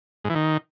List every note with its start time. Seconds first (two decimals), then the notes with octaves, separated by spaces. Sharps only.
0.24 G#2
0.30 E3
0.35 D#3